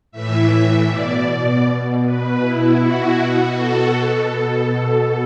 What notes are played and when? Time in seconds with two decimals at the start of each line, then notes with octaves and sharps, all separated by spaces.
0.12 A2 E3 E5
0.89 B2 D5
1.65 B2
2.04 B4
2.41 B2 E4
2.80 F#4
3.18 B2 F#4
3.57 A4
3.95 B2
4.33 A4
4.71 B2